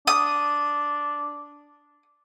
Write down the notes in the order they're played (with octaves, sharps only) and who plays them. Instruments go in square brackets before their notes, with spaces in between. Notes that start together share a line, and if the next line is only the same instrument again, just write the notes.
[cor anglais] D4 [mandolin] D#6